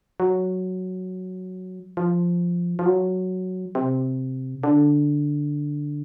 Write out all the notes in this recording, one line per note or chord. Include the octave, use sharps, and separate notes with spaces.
F#3
F3
F3
F#3
C3
D3